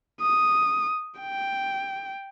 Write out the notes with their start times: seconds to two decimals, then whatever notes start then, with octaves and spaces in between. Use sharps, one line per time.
0.21 D#6
1.21 G5